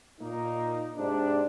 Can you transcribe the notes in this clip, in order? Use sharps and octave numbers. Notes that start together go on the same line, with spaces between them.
A#2 A#3 D#4
G#2 C3 D4